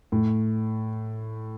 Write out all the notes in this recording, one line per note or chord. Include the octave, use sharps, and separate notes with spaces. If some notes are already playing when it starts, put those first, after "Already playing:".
A2